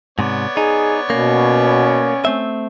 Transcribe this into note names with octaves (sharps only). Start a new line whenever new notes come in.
G#2 C3 B3 C#5 D5
D#4 G#4
B2 A#3 C#4
A3 C4 E5